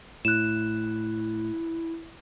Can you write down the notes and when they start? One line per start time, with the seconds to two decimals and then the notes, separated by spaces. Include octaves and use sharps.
0.25 A2 E4 F#6 E7